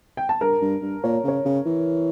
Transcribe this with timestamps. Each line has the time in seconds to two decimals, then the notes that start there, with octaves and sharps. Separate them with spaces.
0.17 G5
0.29 A5
0.41 G2 A#4 A#5
0.61 G2
0.82 G2
1.04 A#2 C#5
1.24 C#3 C#5
1.45 C#3
1.66 E3